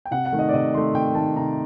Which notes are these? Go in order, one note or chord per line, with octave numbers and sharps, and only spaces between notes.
G5
C3 F#5
F#5
D#3 A3
D#5
D5
C3 D#5
D#3 A3 C6
C3 G5
D#3 A3 A5
C3 A#5